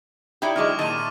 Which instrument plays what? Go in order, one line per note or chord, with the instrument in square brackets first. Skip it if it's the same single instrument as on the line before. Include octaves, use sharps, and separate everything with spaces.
[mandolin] D#4 E4 D5 [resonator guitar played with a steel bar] G4
[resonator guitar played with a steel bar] D3 F#3 G#3 [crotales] C#6 D6 F6
[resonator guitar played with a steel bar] A#2 D#3 [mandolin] A5 [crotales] E6 D#7